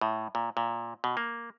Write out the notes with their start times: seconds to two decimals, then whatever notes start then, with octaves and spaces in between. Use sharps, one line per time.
0.01 A2
0.35 A#2
0.57 A#2
1.04 B2
1.17 A#3